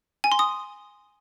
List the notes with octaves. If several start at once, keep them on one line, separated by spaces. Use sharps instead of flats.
G#5
C6
D#6